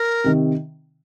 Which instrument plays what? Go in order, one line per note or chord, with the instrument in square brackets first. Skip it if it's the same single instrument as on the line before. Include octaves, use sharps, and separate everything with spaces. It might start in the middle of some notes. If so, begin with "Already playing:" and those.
Already playing: [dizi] A#4
[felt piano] C3 D#3